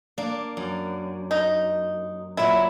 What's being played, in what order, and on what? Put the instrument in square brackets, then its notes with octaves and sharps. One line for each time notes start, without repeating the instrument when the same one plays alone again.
[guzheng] A#3 D4
F#2
[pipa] D#4
[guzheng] A#2 F#3 [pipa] E4